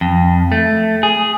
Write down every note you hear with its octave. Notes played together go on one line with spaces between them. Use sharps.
F2
A3
G#4